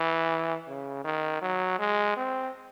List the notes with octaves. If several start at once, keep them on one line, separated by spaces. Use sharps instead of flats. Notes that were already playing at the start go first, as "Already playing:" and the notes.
Already playing: E3
C#3
D#3
F#3
G#3
C4